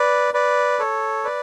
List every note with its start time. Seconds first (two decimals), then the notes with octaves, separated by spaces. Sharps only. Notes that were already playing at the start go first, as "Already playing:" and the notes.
Already playing: B4 D5
0.34 B4 D5
0.79 A4 C#5
1.24 B4 D5